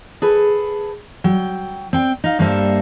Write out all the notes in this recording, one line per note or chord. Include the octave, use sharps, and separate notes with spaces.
G#4 A4 B4
F#3 G5
C4 G5
D#4 F5
G2 G3 A#3 A4 C5 E5